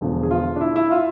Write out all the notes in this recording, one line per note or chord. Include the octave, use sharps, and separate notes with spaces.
E1 E2 D3 F3
G#4
F4
D4
E4
E4
F4